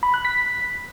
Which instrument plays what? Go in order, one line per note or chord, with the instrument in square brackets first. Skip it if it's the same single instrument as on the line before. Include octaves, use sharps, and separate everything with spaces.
[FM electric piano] B5
F#6
B6